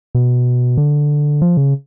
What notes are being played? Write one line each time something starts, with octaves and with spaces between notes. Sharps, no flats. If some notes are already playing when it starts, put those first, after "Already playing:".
B2
D3
F3
C#3